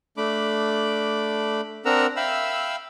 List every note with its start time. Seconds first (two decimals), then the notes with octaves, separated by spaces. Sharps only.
0.17 A3 D4 B5 D6
1.85 C4 D4 A#4 F#5 A#5 E6
2.16 E5 F5 G5 B5 E6